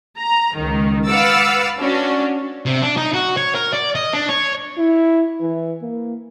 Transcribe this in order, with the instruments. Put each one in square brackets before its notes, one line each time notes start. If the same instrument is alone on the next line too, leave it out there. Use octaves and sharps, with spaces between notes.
[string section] A#5
C#2 D#3
B4 F5 F#5 D6 E6 A6
C#4 D4 F#4
[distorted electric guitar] C3
D4
D#4
F#4
C#5
A#4
D5
D#5
D4
C#5
[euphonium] E4
E3
A#3